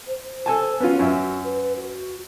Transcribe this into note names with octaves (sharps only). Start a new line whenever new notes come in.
C5
A4 G#5 A5
B3 C#4 F4 F#4
F#2 E5
B4
F#4